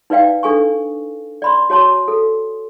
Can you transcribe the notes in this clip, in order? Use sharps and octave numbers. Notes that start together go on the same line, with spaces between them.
D#4 B4 D5 F5 G5
D4 A4 G#5 C#6
D5 B5 C6
F#4 C#5 A5 C6
A4